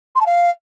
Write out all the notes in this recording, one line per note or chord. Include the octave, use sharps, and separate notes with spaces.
C6
A5
F5